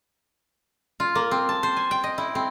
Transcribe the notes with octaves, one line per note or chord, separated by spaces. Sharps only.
F4
A#3
C4
A5
C5
G#5
G5
D#5
E4
C4